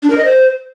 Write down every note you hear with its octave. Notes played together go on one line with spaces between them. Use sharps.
D4
A#4
D#5
C5